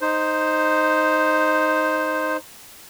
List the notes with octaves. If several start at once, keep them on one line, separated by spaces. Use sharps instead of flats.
D#4 C5